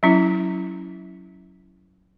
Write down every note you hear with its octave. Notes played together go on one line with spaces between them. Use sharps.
F#3 C#4 E4